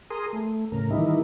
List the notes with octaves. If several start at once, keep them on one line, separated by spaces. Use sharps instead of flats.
G#4 A#4 C6 D#6
A3
A2 C#3 A#4
D#3 E3 G3 A#3 D#4 E4